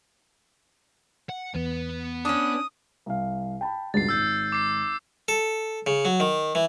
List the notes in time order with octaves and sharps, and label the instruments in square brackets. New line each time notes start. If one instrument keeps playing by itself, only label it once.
[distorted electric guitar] F#5
[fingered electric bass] E2 [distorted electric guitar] B3 B4
[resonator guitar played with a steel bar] C#4 D4 [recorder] D#6
[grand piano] C2 F5
G5 A5 B5
[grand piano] C#2 G2 B2 [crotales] A6 C7
[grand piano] G#1 [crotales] E6 G6 C7
[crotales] D6 C7
[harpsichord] A4
C#3
F#3
D#3
E3